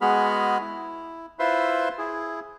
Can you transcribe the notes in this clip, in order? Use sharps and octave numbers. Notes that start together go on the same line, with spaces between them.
G#3 B3 F#4 G#4 B5 F6
E4
E4 F4 B4 C5 E5 C6
E4 G#4